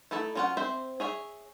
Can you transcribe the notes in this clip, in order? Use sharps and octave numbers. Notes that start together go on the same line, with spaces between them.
A3 D#4 E4 A4
F#3 C#4 F4 A4 F#5
C4 C5 E5
G#4 C#5 E5